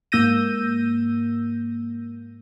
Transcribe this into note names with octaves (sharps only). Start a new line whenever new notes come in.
G#2 A#3 E6 G6 A#6 D#7